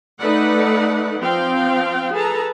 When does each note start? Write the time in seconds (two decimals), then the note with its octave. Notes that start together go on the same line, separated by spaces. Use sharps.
0.20 A3 D#4 A4 B4 D5 F#5
1.20 F3 C4 F5 G5
2.14 G#4 A4 B4 A5 A#5